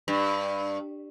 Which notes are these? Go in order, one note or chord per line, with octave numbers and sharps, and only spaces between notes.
G2